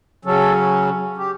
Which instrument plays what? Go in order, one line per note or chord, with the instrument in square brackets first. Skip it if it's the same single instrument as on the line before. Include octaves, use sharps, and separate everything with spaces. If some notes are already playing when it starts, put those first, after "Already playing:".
[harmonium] C#3 F#3 C#4 A4
G4